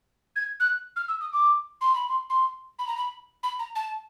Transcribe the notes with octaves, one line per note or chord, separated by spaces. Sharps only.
G#6
F#6
F6
E6
D#6
D6
C6
B5
C6
C6
B5
A#5
B5
B5
A#5
A5